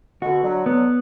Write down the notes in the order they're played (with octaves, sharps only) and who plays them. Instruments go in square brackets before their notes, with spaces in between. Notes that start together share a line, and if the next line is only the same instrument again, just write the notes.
[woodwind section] B2 D3 [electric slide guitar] F#4
[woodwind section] D3 F#3
[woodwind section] D3 F#3 [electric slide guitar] B3